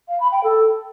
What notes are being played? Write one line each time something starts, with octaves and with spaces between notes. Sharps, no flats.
F5
B5
G5
A4